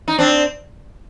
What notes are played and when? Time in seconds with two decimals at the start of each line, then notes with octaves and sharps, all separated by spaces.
0.08 D#4
0.19 C4 D4